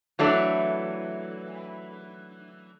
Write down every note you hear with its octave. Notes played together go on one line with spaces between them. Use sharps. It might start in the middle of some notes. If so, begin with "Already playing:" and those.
E3 F#3 A3 D4